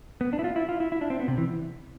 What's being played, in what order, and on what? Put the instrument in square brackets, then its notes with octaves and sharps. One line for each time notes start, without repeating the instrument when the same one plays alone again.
[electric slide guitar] B3
D4
E4
F4
E4
F4
E4
E4
D4
C4
B3
C3
E3